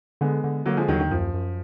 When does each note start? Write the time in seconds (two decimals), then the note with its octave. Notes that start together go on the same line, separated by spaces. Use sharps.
0.21 D3 G#3 B3
0.44 D3
0.66 D3 F#3 A#3
0.77 F3 G#3
0.88 D#2 D#3 F#3
1.00 D#3
1.11 F#2 F3
1.34 F#2